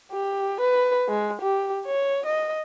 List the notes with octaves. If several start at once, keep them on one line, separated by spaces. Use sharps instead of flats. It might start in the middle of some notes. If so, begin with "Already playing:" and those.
G4
B4
G#3
G4
C#5
D#5